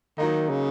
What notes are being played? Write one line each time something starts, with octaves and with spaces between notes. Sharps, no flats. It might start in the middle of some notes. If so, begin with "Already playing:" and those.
D#3 F#3 A#3 D#4
C#3